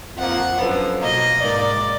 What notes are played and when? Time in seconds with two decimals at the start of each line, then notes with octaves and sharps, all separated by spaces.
0.17 F2 F3 A#3 F#5
0.60 F#2 D3 F3 B3
1.01 B2 A#3 D#5
1.43 G#2 D#3 A#3 D5